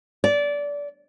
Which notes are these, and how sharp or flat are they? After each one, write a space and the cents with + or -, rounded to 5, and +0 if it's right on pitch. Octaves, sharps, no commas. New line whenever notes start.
D5 -20